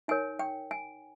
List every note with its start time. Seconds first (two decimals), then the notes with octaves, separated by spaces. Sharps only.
0.08 D#4 A#4 C#5 G#5
0.39 G5
0.71 G#5